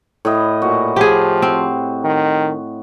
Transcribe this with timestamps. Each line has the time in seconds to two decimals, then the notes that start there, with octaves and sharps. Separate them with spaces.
0.25 A2 E4 D#5
0.62 A#2 F#4
0.96 F3 G4 G#4
1.42 C4
2.04 D#3